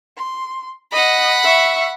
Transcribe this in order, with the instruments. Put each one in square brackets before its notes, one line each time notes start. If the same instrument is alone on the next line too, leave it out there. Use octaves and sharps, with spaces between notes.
[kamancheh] C6
[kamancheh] D#5 [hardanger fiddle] F#5 B5
[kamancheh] E5 C#6